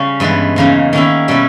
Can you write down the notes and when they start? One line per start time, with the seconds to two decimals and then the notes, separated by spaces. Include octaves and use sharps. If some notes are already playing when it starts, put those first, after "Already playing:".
Already playing: C#3 G3 C#4
0.20 G2 E3 G#3 B3
0.56 E2 C#3 E3 A#3 D#4
0.93 D#3 A#3 C#4 E4
1.28 B2 G3 C#4 E4